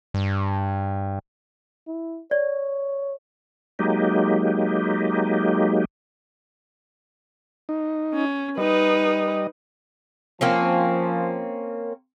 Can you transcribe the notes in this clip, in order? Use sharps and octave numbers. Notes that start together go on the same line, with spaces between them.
G2
E4
C#5 D5
F#3 G#3 A#3 D#4 G4
D#4
C#4
G3 D#4 B4 D#5
F3 A#3 C4 C#4